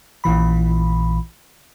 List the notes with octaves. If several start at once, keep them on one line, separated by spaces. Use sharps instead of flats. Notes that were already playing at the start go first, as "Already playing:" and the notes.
A#1 A#2 E3 B5